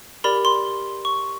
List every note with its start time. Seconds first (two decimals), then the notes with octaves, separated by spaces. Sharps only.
0.24 G4 A#4 D5 B5
0.45 C6
1.05 C#6